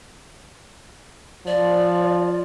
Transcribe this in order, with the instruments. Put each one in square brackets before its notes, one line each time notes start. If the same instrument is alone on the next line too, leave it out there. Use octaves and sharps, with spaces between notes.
[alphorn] F3 [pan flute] D5